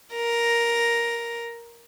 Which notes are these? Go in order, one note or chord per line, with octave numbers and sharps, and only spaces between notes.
A#4 A#6